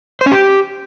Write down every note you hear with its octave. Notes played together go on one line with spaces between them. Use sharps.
C5
C#4
G4